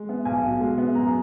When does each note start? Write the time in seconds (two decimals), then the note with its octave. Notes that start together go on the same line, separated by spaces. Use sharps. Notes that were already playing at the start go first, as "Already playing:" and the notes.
Already playing: G#3
0.09 B3
0.25 B1 G#5
0.43 B2
0.60 G#3
0.78 B3
0.95 F#2 A#5